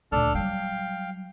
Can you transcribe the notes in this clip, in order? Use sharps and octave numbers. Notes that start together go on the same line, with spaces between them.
D2 A#2 D4 A4 F6
F#3 G3 F5 G5